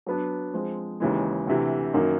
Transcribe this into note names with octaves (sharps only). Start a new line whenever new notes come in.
F#3 B3 D4
F3 G#3 C4
D#2 C#3 E3 G#3
D2 C3 E3
F#2 D#3 F#3 A#3